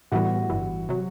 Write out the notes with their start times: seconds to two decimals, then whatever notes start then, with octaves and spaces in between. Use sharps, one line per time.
0.12 A2 E3 G3 B3 F#4
0.50 G1 G2 E3
0.89 C3 F#3